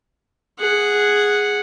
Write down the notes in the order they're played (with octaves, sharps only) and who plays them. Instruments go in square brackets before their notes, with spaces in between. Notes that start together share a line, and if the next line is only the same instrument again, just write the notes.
[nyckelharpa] G#4 F#5